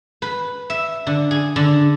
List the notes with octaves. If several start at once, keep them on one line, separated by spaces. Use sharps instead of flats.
B4
E5
D3
G#4
D3